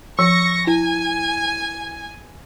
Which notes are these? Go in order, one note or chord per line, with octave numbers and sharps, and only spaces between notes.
F3 C#6 E6 A#6
E4 G#5